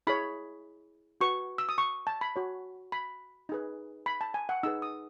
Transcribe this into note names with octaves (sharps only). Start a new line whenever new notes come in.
E4 G#4 C#5 B5
F#4 B4 C#6
E6
D#6
C#6
A5
B5
F#4 C#5
B5
D#4 G#4 B4
B5
A5
G#5
F#5
D#4 G#4 B4 E6
D#6